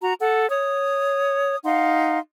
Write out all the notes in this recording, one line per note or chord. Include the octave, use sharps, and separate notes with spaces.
F#4 A#5
A4 F#5
C#5 D#6
D#4 F5 F#5 C6